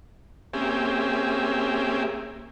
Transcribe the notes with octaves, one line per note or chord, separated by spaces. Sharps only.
A#3 C4 C#4 G4 G#4 E5